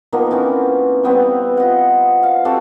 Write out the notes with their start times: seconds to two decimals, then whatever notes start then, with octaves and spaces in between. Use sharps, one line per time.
0.13 D#3 F3 A#3 B3
0.31 E3 C4 C#4
1.03 G3 B3 C4
1.57 F4 D#5 F#5
2.23 F5
2.45 C4 F#4 G4 A4